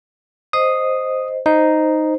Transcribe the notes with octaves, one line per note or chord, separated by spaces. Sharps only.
C5 D#5 D#6
D#4 C5